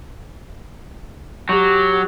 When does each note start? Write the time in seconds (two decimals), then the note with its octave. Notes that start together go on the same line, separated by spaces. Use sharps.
1.49 F#3 G4